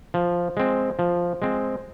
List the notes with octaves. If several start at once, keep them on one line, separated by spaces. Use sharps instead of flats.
F3
G#3 C4
F3
G#3 C4